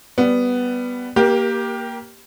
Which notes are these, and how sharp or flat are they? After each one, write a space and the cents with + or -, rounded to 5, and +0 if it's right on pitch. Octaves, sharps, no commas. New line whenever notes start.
G3 +0 B3 +0
A#3 +0 G4 +0 A#4 +30